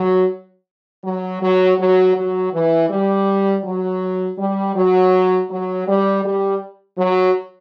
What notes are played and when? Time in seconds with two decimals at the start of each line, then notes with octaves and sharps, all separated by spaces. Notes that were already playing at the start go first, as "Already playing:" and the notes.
Already playing: F#3
1.04 F#3
1.41 F#3
1.78 F#3
2.16 F#3
2.53 E3
2.90 G3
3.64 F#3
4.38 G3
4.76 F#3
5.50 F#3
5.87 G3
6.24 G3
6.98 F#3